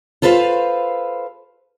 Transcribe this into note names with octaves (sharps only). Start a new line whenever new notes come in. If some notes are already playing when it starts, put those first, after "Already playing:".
F4 A4 B4 C5 F5